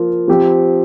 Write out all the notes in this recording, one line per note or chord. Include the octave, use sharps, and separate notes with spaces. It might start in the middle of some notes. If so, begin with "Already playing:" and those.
Already playing: F3 A#3 F4
F3 C4 G4